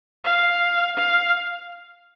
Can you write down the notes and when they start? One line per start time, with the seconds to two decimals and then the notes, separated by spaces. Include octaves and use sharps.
0.24 F5
0.97 F5